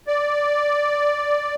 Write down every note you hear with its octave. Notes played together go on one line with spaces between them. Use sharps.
D5